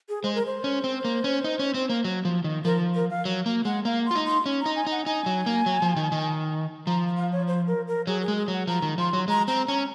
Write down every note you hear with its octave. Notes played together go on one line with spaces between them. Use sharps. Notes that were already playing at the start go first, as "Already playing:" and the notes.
G#4
G#3 C5
A#4
C5
C#4
C4
A#3
C#4
D#4
C#4
C4
A#3
F#3
F3
D#3
F3 A#4
A#4
F5
F#3
A#3
G#3 F#5
A#3 F5
F4 C6
D#4
C6
C#4
D#4 A#5
G#5
D#4 F#5
D#4 G#5
F#3
A#3
F#3
F3
D#3
D#3
F3 A#5
F5
C#5
C5
A#4
A#4
F#3 G#4
G#4
G#3
G#4
F#3 F#5
F3 A#5
D#3
F3 C6
F#3
G#3 A#5
C4 A#5
C#4 A#5